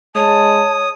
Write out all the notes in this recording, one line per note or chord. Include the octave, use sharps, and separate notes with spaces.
G#3 C#5 A5 D#6